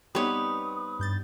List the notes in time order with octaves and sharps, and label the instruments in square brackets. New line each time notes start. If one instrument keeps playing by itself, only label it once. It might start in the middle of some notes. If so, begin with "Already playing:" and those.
[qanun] G3 B3 D#4 [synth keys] C4 [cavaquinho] B4 C#5 [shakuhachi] D#6
[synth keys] G2 G6 A6